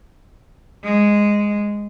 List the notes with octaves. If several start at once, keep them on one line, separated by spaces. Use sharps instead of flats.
G#3